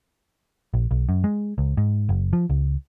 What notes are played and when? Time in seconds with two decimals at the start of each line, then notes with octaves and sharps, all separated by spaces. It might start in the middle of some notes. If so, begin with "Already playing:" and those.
0.74 A#1
0.91 B1
1.09 F#2
1.24 G#3
1.58 C#2
1.77 G#2
2.09 F#1
2.33 F3
2.50 C#2